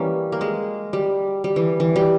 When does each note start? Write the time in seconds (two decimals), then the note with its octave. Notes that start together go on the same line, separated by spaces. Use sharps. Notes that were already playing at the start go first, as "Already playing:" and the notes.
Already playing: E3 G3 A#3 C#4
0.32 A#3
0.41 G#3
0.93 G3
1.44 G3
1.56 E3
1.80 E3
1.96 G3